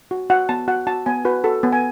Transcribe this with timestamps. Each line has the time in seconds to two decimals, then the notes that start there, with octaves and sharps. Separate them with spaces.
0.11 F#4
0.30 F#4 F#5
0.49 B3 A5
0.68 F#4 F#5
0.87 F#4 A5
1.06 B3 G#5
1.25 F#4 B4
1.44 F#4 A4
1.63 B3
1.73 G#5